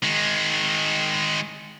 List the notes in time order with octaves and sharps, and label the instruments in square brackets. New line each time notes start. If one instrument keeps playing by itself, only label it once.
[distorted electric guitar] D#3 G#3